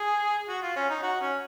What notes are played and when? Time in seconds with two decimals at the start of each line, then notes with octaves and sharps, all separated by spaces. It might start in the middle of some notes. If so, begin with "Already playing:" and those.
Already playing: G#4
0.49 F#4
0.62 F4
0.76 C#4
0.90 D#4
1.02 F#4
1.21 C#4